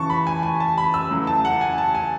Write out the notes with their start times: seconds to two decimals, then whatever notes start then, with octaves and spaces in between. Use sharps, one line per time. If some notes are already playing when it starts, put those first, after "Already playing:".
Already playing: E2 C#3 E3 A5 C#6
0.10 B5
0.27 G#5
0.43 G#5
0.60 A5
0.78 B5
0.94 E6
1.10 E2 C#3 F#3 A3
1.27 A5
1.45 F#5
1.61 G#5
1.78 A5
1.95 G#5